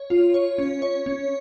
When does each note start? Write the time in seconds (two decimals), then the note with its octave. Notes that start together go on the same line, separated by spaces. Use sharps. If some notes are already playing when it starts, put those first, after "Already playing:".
Already playing: C#5
0.10 F4
0.34 C#5
0.58 C#4
0.82 C#5
1.06 C#4